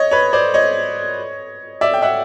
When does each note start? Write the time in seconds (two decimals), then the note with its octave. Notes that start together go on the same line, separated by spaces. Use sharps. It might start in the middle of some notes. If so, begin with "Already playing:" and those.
Already playing: C#5 D#5
0.11 B4 C#5
0.33 C5 D5
0.54 C#5 D#5
1.81 D5 E5
1.94 G5
2.02 E5 F#5